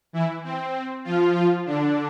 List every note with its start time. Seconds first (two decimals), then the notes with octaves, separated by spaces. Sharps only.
0.13 E3 E4
0.44 C4
0.74 C4
1.04 F3 F4
1.35 F3 F4
1.66 D3 D4